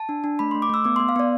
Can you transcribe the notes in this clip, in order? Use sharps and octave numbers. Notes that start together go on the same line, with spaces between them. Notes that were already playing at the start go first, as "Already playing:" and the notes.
Already playing: A5
D4
D4
A3 B5
A3 C6
D6
A3 E6
B3 D6
B3 C6
F5
B3 D5